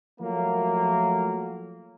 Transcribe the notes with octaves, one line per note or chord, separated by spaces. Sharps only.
F3 F#3 A3 A#3